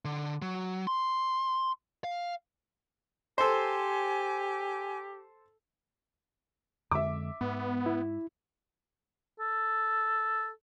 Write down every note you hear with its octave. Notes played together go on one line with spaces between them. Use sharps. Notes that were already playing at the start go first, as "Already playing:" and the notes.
D3
F#3
C6
F5
G4 A4 C5 G#5
F2 D3 G#3 E5 D6
G#2 B3
E4
A4